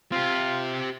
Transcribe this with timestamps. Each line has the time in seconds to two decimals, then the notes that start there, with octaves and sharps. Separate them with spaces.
0.12 C4 F4 G4